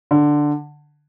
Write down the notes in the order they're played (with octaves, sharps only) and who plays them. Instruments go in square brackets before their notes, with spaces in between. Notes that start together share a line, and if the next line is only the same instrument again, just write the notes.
[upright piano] D3